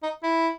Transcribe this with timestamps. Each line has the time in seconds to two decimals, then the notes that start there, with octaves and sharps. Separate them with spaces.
0.03 D#4
0.23 E4